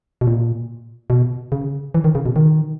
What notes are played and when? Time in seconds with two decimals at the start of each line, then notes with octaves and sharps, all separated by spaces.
0.21 B2
0.27 A#2
1.10 B2
1.52 C#3
1.94 E3
2.04 D#3
2.15 C#3
2.26 B2
2.36 D#3